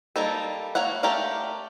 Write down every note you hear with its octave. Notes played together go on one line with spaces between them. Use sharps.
G3 A#3 D#4 A4
A#3 C#5 F5 F#5
A3 G4 A#4 D5 F5